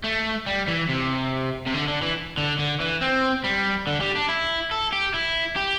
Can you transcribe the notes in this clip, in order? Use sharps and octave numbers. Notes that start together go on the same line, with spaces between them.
A3
G3
E3
C3
C3
D3
D3
E3
D3
D3
E3
C4
G3
D3
G3
D4
E4
A4
G4
E4
G4